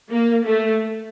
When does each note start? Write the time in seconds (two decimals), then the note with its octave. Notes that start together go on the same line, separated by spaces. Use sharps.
0.10 A#3
0.46 A3